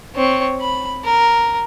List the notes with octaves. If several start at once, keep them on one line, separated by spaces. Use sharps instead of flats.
C4 C#5
B5
A#4